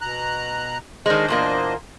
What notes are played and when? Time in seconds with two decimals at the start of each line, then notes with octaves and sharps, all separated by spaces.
0.01 B2 A#5 F#6
1.06 D#3 G#3 D4 C5 D#5
1.28 E2 A#2 A#3